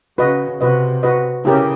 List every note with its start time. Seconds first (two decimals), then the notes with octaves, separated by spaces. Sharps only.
0.18 C#3 F#4 B4 D#5
0.60 C3 F#4 B4 D#5
1.03 F#4 B4 D#5
1.45 C#3 E4 G4 A#4